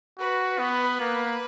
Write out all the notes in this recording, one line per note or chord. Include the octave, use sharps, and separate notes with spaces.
F#4 B4
B3
A#3